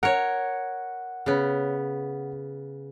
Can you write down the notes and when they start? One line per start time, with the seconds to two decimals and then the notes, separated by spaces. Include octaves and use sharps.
0.03 A#4 C#5 F#5
1.26 C#3 B3